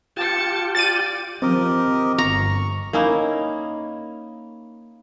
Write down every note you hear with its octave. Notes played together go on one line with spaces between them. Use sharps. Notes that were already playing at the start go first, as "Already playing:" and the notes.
F4 G4 G5 A5 C#7
D5 A6 D#7
F3 C4 G4 A#4 D#5
G1 A#5 C#6
A#3 C#4 D#4 E4